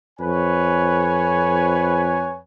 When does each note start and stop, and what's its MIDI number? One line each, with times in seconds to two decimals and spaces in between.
0.20 2.39 41
0.20 2.39 71
0.20 2.39 73
0.20 2.39 80